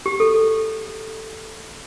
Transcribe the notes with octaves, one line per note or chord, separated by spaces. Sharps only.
G4
A4